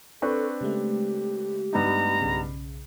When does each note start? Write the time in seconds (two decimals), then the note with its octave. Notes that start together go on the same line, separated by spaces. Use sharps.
0.22 C4 D4 A4 B4 C#6
0.61 C#3 G#3 A3 G4
1.73 G2 B3 D#4 A#5
2.21 B1 C#3